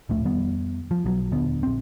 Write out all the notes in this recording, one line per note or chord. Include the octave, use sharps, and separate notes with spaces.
D1 A#1 A3
F2 D#3 G3 B3
F3
B1 F3 F#3
D#1 D3 B3
A#1 C4